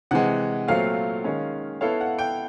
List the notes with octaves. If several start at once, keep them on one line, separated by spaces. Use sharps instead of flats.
C3 E3 G#3 F#5
A#2 F#3 A3 C4 F4 F5
D#3 G#3 C#4
B3 E4 A4 C#5 F5
F#5
G5